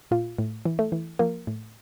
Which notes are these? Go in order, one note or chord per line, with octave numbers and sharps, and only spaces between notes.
A#2 F4
A2
E3
A3
E3
F3 A#3
A2